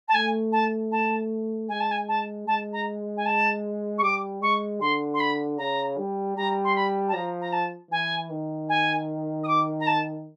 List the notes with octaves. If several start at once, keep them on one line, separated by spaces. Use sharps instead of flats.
A5
A3 G#5
A5
A5
G#3 G#5
A5
G#5
A5
G#3 A5
A#5
G#5
A5
C#6
G3 D6
G#3 C#6
D3 C6
C6
B5
C#3 A#5
G3
G3 A#5
C6
B5
A5
F3 A#5
A#5
A5
E3 G#5
D#3
G#5
D#6
D6
A#5
A5